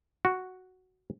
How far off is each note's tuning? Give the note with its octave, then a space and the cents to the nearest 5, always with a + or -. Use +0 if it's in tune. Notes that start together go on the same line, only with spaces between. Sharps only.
F#4 +0